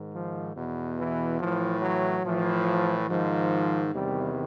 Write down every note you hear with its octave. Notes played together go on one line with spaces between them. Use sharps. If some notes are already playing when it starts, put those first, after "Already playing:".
Already playing: G#2 D#3
F3
E2 B2
E3
A2 E3 F3
F#3
A2 E3 F3
G#2 D#3 F3
E2 C3 D#3 G3